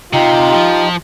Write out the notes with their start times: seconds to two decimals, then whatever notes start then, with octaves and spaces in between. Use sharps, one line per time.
0.13 C3 D#4 F4 G4
0.54 F3